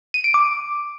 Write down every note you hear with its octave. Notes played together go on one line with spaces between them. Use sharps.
D#7
D7
D6